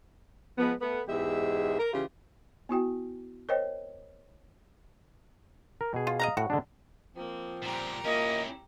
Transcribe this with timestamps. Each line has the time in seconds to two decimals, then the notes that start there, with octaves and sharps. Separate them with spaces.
0.58 F3 G#3 B3
0.81 A3 B3
1.08 E2 G#2 G#3 G4 E5
1.79 A#4
1.93 C#3 E3 F4 G4
2.69 B3 E4 F#4 G5
3.49 A#4 C5 C#5 D#5 G5
5.81 A#4
5.94 B2 G#4
6.07 F4
6.20 D#5 F5 A#5
6.37 A2 F#4
6.50 D3 G#3 D4
7.16 F3 A#3 C4
7.63 A#2 G3 G4 A#5
8.05 A#2 A#3 C#4 E4 D#5